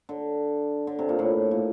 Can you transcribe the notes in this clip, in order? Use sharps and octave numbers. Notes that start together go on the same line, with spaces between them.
D3
D3
C3
A#2
A2
A#2